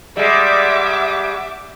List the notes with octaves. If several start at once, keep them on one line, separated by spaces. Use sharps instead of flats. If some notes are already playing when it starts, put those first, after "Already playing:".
G3 G#3 E5 F#5 D6